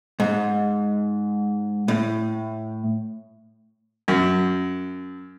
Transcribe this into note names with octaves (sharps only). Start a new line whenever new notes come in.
G#2
A2
F#2